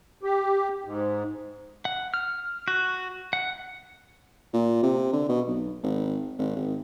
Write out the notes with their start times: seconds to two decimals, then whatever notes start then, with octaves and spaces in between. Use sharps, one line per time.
0.23 G4
0.85 G#2
1.85 F#5
2.14 F6
2.68 F#4
3.33 F#5
4.53 A#2
4.83 C3
5.13 D3
5.29 B2
5.47 B1
5.83 G#1
6.38 G#1
6.56 G#1